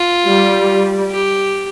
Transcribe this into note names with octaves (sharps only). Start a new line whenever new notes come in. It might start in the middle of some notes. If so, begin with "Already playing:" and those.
Already playing: F4
G3
G4